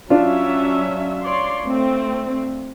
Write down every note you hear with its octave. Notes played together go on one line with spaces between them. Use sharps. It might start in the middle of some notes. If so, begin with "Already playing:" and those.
F#3 C#4 D4 F4 E5
C#5 D5 C6
A3 C4